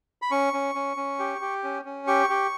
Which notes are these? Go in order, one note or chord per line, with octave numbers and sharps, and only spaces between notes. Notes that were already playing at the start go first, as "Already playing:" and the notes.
B5
C#4 C#6
C#4
C#4
C#4
G4
G4
C#4
C#4
G4 C#6
G4